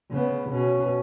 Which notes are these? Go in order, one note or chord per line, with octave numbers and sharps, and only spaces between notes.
C#3 B3
B2 C#4